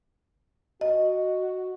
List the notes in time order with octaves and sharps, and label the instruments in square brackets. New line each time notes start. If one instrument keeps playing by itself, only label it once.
[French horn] F#4 [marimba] D#5